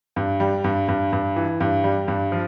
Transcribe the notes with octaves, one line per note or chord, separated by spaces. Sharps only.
G2
G3
G2
G2
G2
E3
G2
G3
G2
F3